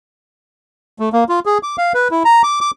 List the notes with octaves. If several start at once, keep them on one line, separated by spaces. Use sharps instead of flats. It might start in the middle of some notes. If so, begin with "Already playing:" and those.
A3
A#3
F4
G#4
D6
F5
B4
E4
A#5
D6
D6